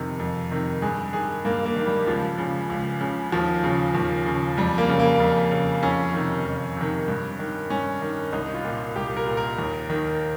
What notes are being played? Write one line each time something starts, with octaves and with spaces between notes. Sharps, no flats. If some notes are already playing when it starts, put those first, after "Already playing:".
Already playing: F2 C3 D#3
F2
C3 D#3
G2 G#4
D#3 G#4
G2 A#3
A#3
D#3
G3
C#2 F3
C#3
C#2
C#3
D#2 F3
C#3
D#2
C#3
F2 G3
A#3
C#3
A#3
F2
C#3
F2 C#4
C3 D#3
F2
C3 D#3
G2
D#3
G2 C#4
D#3
C2 D#4
F4
A#2
C2 G4
A#4
A#2
A#4
D#2
D#3